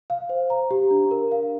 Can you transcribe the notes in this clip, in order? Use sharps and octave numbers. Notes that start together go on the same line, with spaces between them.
F5
C5
A#5
G4
D4
A#4
F5